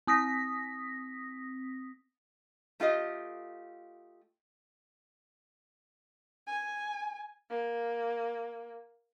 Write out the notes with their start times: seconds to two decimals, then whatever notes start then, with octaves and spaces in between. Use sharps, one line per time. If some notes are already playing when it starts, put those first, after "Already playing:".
0.07 C4 D#6 A#6 B6
2.80 A3 F4 G4 D#5
6.47 G#5
7.51 A#3